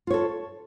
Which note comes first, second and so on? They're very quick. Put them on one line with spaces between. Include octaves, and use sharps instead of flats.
F4 C#5 A4